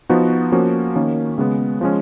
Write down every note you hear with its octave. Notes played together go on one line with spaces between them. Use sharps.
F3 B3 D#4 F#4
F3 A#3 C#4 F#4
D#3 A#3 C#4
C#3 G#3 B3
F3 G#3 C#4